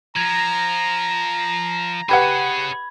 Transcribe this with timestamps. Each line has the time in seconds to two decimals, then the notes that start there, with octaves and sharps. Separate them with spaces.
0.16 F3 A#5 G#6 A#6
2.09 G4 G#4 B4 C#5 F#5 B5 G#6